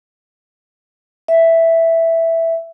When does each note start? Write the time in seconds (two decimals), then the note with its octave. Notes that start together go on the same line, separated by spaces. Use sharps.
1.28 E5